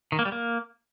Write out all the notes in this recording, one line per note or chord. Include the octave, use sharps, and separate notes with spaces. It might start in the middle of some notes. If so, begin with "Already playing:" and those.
D#3
A#3
G3
A#3